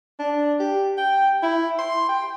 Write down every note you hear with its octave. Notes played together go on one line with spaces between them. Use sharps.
D4
G4
G5
E4
C6
G5